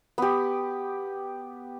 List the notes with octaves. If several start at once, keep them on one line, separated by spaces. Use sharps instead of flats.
B3 G4